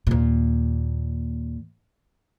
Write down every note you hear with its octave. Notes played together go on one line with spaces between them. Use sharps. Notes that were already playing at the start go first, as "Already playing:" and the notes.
D#2 A#2